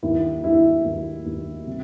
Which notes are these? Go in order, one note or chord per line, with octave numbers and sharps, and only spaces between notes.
D#2 E4
D#2 E4
D#2
D#2
C3